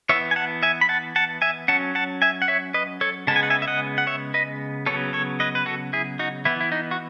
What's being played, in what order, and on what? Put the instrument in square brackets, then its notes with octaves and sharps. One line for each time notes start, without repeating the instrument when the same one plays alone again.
[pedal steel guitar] E3 B3 C#5 E5
G#5
F#5 A5
E5 G#5
B5
F#5 A5
F#5 A5
E5 G#5
F#3 C#4 F#5 A5
F#5 A5
E5 G#5
F#5
C#5 E5
B4 D#5
A4 C#5
C#3 G#3 B3 A5
G#5
F#5
E5 G#5
E5
D#5 F#5
F#5
C#5 E5
B4 D#5
C#3 F#3 B3 A4 C#5
A4 C#5
B4 D#5
B4
F#4 A4
E4 G#4
D#4 F#4
E3 B3 E4
E4
D#4
F#4